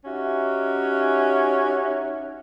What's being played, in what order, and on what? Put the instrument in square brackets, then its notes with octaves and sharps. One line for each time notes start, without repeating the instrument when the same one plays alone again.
[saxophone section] C#4 D#4 F#4 G4 E5